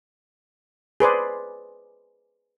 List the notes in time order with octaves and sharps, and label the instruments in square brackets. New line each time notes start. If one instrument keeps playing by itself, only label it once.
[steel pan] G#4 B4 C5 D5